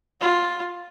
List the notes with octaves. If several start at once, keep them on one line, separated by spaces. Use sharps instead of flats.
F4